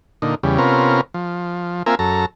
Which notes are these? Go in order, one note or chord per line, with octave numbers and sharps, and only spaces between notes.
A#2 D3 D#4
E2 C#3 G3
C3 B3 C#4 F4 A#4
F3
A#3 C4 F4 A#4 E5 G#5
F#2 A4 A#5